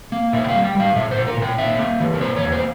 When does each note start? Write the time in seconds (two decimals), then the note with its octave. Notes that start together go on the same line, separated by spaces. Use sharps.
0.12 A#3
0.33 A#2 E5
0.44 G5
0.48 F5
0.54 G3
0.64 G5
0.75 G3 F5
0.96 A#2 E5
1.11 A#2 C5
1.27 A#4
1.37 A#2
1.42 G5
1.58 A#3 E5
1.79 A#3
2.00 E3
2.14 A#4
2.20 A#3 C5
2.36 C#5
2.42 E2
2.52 C5